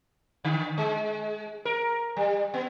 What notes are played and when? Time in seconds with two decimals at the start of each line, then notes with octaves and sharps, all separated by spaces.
0.44 D3
0.78 G#3
1.65 A#4
2.17 G3
2.54 B3